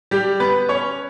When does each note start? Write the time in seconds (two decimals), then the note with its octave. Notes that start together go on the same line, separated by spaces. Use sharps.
0.11 G3 G4
0.40 B3 B4
0.69 C#4 C#5